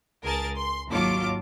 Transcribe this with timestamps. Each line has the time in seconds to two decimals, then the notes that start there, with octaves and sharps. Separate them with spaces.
0.24 C#2 G#4 A#4 A5 A6
0.56 C6
0.89 G#1 D#2 F#3 F4 A5 D6